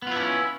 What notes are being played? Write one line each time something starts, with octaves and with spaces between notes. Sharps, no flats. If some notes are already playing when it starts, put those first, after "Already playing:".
B3 C#4 D4 E4 F4